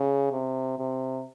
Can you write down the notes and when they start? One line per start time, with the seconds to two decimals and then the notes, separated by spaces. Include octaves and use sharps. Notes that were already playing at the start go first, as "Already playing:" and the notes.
Already playing: C#3
0.32 C3
0.79 C3